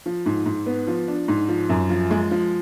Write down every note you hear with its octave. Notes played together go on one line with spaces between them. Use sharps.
F3
G#2
G#2
B3
F3
D4
G#2
F3
F#2
F3
G#3
F3